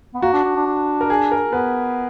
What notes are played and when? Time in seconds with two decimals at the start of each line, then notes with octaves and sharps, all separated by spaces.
0.14 B3
0.22 A#3 F#4
0.33 D4
0.44 D4
0.56 D4
0.67 D4
1.01 A#4
1.10 G#4
1.32 A#4
1.52 B3 B4